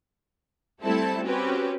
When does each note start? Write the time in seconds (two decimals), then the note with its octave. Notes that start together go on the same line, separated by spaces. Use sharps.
0.82 G3 A3 C4 E4 A4 A5
1.24 C4 C#4 F#4 G4 B4